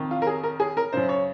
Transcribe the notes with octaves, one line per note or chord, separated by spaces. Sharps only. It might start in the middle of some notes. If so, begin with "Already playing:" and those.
Already playing: F2 D#3
F4
A#4
G#4
A#4
G#4
A#4
F#2 C#3 C5
C#5